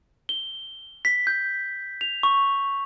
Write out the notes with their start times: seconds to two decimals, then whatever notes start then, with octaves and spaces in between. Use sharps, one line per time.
0.29 G7
1.05 B6
1.27 G6
2.01 F7
2.23 C#6